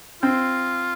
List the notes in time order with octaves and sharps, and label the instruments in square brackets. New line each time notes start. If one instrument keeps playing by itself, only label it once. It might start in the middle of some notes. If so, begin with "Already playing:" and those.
[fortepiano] C4 [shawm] F4